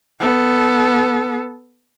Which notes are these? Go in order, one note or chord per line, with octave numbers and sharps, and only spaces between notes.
B3 A4